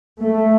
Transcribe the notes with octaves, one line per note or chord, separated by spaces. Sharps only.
A3